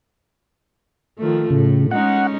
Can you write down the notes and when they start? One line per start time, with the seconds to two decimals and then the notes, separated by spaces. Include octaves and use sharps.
1.18 D#3 F3 A3
1.50 A2 C#3
1.91 G#3 C#4 D#4 F#5